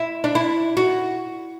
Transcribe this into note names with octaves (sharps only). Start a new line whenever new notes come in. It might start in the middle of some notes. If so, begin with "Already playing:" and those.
Already playing: E4
D4
E4
F#4